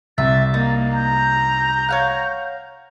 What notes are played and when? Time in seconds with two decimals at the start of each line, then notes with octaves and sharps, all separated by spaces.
0.18 C2 C3 E5 A6
0.54 A#3 D#4
0.95 A#5 G6
1.89 C#5 F5 F#5